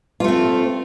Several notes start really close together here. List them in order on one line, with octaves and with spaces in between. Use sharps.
F4 A3 C4